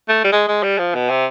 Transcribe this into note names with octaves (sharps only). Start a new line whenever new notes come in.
A3
G3
G#3
G#3
G3
F3
B2
C3